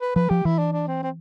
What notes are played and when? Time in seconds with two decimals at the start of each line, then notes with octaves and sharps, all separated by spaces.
0.01 B4
0.16 F3 B4
0.29 F3 G4
0.45 E3 E4
0.58 D4
0.73 D4
0.87 C4
1.03 C4